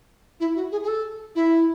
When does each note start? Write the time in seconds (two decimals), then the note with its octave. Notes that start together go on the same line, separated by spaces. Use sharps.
0.40 E4
0.55 F#4
0.72 G#4
0.83 G#4
0.87 A4
1.35 E4